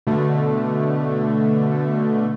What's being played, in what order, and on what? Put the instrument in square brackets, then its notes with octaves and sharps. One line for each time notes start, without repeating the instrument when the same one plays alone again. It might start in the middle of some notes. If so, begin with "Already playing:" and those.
[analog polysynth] B2 D3 A3